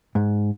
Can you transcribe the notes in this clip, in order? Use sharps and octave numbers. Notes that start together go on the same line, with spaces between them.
G#2